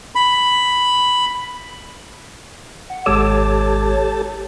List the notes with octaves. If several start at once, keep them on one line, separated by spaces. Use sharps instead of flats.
B5
F#5
G#1 G#3 G4 A4 C#5 A5 D6